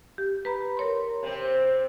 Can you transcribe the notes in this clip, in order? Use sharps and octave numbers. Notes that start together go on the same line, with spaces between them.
G4
B4 A#5 B5
A#4 C#5 C6
C3 C4